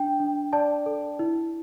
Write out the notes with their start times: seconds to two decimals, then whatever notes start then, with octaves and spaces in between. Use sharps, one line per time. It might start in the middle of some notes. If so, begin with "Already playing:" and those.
Already playing: D4 G5
0.20 D4
0.53 D5 A5
0.86 A4
1.19 E4